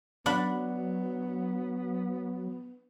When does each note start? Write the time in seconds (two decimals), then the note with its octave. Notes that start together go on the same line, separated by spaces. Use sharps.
0.26 F#3 B3 D4 F#5 B5